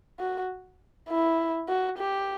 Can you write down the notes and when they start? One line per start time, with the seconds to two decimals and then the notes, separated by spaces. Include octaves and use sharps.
0.20 F#4
1.09 E4
1.68 F#4
1.98 G4